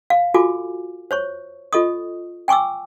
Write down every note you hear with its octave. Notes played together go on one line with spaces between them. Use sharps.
F5
F4 F#4 A4 G#5 D6
C5 C#5 C#6
F4 A4 D#5 C#6 D#6
G5 G#5 C#6 D6 E6